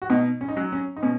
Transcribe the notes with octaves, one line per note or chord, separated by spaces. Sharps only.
F#4
B2 D#4
C#4
D#4
F#3 C#4
C#4
D#4
B2 C#4